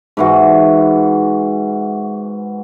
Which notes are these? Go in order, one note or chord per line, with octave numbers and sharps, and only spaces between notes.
G#2 E3 F#4